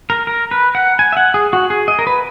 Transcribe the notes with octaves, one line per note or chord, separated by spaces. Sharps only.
A#4
A#4
B4
F#5
G#5
E5
F#5
G#4
F#4
G#4
D#5
A#4
B4